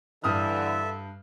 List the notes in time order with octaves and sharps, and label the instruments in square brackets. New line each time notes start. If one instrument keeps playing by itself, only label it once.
[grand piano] G2 D#6 F6 [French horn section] D3 E3 [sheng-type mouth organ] A4 E5